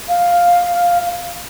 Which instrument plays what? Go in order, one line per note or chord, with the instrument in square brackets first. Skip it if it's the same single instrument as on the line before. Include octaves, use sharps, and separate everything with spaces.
[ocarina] F5